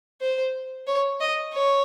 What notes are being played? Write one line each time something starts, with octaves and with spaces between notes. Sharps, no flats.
C5
C#5
D#5
C#5